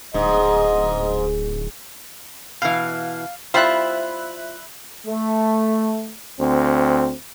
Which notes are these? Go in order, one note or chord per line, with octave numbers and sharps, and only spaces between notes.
D1 G#2 D#5
B2 E3 F5
G3 C4 E4 F4 C5 E5 B5 F#6
A3
D2 C4